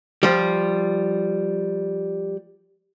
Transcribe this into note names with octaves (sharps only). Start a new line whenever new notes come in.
F3 G3